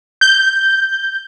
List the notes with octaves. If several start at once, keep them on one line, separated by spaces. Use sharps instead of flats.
G6